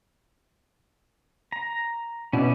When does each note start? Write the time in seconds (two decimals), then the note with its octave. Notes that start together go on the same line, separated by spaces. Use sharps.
1.52 A#5
2.33 B2 C#4 E4 D5